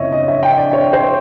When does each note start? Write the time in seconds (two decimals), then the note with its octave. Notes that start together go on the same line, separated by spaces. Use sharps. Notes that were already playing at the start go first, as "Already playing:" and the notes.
Already playing: F#1 F2 C#3 E3 C#5 D#5 E5
0.12 D#5
0.28 E5
0.43 G5
0.58 D5
0.73 C#5
0.93 C5